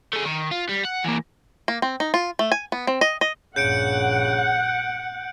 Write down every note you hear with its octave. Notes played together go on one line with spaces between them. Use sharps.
A3 G#4
D#3
F4
G3
F#5
E3 A#3
A#3
C4
D#4
F4
A3
G#5
B3
C4
D#5
D#5
A#1 G2 C#3 F#5 G6 C#7 D7